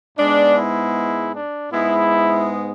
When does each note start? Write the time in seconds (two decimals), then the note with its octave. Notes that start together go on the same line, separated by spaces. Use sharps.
0.18 G#2 G#3 B3 D4
0.57 E4
1.35 D4
1.72 G#2 G#3 B3 E4